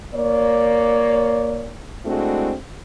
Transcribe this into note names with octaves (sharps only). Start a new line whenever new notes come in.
A#3 C#5 D5
G#3 A3 C4 D4 E4 F#4